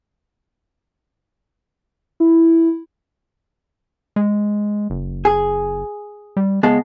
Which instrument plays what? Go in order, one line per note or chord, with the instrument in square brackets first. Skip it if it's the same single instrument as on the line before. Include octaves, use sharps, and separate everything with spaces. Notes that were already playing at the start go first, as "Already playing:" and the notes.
[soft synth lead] E4
[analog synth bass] G#3
F#1
[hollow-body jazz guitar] G#4
[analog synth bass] G3
[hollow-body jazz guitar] C#2 G#3 A5 [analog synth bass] B3